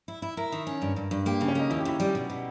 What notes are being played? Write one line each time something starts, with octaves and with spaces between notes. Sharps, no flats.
E4
E4
E4 A#4
D#3
C#4
G2
G2
G2
A#3 G4
C#3
C#4
A#3 D#4
D#2 E4
G4
D#2 E4
G3
B2
B2